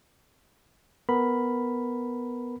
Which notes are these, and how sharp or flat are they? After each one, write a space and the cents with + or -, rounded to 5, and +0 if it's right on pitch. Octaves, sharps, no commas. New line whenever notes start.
B3 +0 A#4 -5 B5 +0